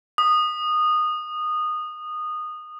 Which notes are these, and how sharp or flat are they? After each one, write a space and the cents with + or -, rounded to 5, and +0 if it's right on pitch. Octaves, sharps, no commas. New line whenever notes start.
D#6 -20